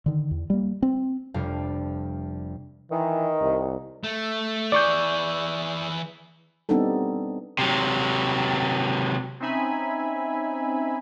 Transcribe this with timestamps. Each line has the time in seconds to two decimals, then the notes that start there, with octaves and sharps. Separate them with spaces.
0.06 D3 D#3
0.31 E2
0.50 G3 A#3
0.82 C4
1.34 F1 F2 G3 D4 F5
2.91 D#3 E3
3.41 C2
4.04 A3
4.72 E3 G#4 D5 C#6 G6
6.69 G3 B3 C4 D4 D#4 A4
7.59 C3 F#3
9.40 C4 C#4 D#4 E5 G#5 B5